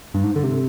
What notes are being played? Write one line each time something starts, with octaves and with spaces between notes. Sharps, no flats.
G2
G#2
D3
C3